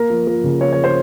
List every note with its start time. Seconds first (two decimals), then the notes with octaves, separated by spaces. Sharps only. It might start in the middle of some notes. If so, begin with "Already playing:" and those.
Already playing: A#3 A#4
0.10 F3
0.27 F3 A#4
0.44 C#3
0.61 F3 C#5
0.73 C#5
0.84 C5